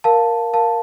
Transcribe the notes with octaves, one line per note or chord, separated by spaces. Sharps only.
A#4 F5 A5
A#4 F5 A5